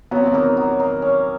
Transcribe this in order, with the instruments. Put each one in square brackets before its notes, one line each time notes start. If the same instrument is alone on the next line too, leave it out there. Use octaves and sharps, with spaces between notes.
[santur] F#3 [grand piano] B3
[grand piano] C4
B3
[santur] A#3 D#4
F#3
A#3 D#4
C#4